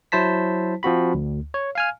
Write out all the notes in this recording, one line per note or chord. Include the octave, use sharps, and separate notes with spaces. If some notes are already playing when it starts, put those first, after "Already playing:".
F#3 E4 C5 A5 B6
F3 C4 F#4 B5
D2
C#5
F5 G#5 F6